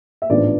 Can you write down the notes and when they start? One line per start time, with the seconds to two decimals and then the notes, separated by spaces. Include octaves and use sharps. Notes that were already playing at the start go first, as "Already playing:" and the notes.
0.22 E5
0.30 A1 G#2 F3 B3 D4 D5